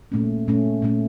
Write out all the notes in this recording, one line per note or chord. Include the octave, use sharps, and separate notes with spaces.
A#2 A3 C#4
A#2 A3 C#4
A#2 A3 C#4